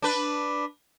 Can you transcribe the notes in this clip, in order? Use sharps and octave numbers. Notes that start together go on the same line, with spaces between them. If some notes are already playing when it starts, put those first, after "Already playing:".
D4 B4